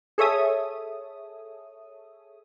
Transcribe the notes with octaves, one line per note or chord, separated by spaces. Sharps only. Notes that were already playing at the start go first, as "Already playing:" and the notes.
G#4 A4 C#5 E5 D#6